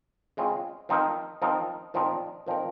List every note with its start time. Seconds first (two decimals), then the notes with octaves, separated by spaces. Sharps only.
0.37 C#3 G#3 C4 F4
0.89 F3 C4 D#4 A#4
1.42 F3 C4 D#4 A#4
1.94 A#2 F3 C4 D#4 A#4
2.47 A#2 F3 C4 D#4 A#4